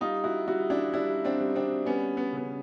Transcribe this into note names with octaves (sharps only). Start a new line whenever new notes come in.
G3 D#4 F4
E4 F#4
G3 E4 F#4
D4 E4
G3 D4 E4
C4 D4
G3
C4 D4
G3 B3 C#4
B3
C#3 B3